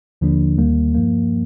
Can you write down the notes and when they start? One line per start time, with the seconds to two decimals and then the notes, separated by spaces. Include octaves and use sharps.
0.21 D#2 D3 F3 A#3 D4
0.58 D#2 D#3 G3 A#3
0.95 G2 F3 A#3